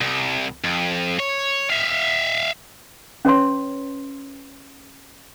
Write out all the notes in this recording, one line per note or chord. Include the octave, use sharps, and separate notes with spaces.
C2
F2
C#5
E5 F5
C#4 B4 C#5 C6